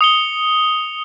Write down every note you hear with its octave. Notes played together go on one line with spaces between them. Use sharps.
D#6 C#7 G7